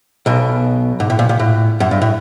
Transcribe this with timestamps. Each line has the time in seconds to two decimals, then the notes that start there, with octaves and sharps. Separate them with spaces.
0.26 B1 B2
1.00 G#2
1.10 A2
1.19 A#2
1.29 A#2
1.39 A2
1.80 F#2
1.91 G2
2.01 A2